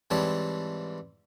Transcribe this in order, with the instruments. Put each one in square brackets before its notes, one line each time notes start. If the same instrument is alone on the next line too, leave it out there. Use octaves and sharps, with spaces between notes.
[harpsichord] G#2 E3 G3 C4 C#5 A5